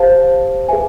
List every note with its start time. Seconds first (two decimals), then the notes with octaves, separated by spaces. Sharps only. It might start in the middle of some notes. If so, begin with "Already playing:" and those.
Already playing: G4 C5 F5 A5
0.69 G#4 B4 E5 G#5